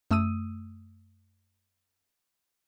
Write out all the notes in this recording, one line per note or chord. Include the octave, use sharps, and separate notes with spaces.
F#2 A3 D#6 E6 D#7